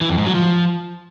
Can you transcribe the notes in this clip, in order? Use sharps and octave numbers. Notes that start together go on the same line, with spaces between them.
E3
F2
G#2
F#3
F3